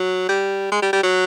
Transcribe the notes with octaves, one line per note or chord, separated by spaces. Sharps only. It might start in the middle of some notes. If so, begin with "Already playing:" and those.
Already playing: F#3
G3
G#3
G3
G3
F#3